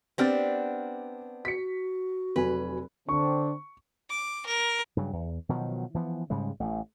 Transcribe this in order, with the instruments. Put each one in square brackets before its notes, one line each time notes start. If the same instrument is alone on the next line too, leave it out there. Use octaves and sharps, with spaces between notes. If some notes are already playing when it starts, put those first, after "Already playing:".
[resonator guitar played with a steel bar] B3 C4 D4 [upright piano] G4 F6 A6
[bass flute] F#4 [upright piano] B6 C#7
[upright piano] F1 F#3 G#5 [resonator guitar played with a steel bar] B4
[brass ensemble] D3 C4 D4 [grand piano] C#6
[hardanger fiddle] D6
A#4
[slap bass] G2 C#3 F#3
E2
B2 D#3 F3 F#3
E3 F3 B3
G#2 C#3 G3 G#3
A1 A3